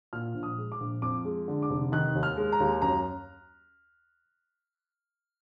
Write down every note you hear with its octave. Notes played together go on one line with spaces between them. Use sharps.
A#2 F6
A#1
D#6
G#3
D6
A#1
F2 D6
G#3
D3
D6
F1
D#3 F#6
D#2
F6
G#3
A#5
D#2
F#2 A#5